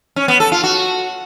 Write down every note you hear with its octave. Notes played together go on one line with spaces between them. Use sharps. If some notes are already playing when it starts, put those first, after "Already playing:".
C#4
B3
A4
F4
F#4